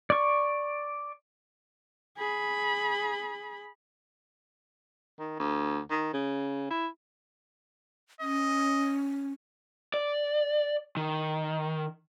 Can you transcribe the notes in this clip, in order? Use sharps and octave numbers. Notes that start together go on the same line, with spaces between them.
D5 C#6
G#4 B5
D#3
D2
D#3
C#3
E4
C#4 D#5
D5
D#3